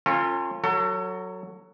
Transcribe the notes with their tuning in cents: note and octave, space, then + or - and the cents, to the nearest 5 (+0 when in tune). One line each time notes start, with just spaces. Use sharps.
C#4 -35 F4 +0 A4 +40
F#3 +0 A4 +30